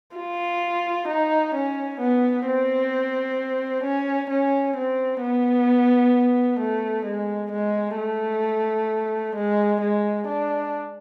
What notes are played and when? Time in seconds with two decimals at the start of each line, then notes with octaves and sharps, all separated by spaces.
0.16 F4
1.08 D#4
1.54 C#4
2.00 B3
2.46 C4
3.84 C#4
4.30 C#4
4.76 C4
5.22 B3
6.59 A3
7.06 G#3
7.51 G#3
7.97 A3
9.35 G#3
9.81 G#3
10.27 D4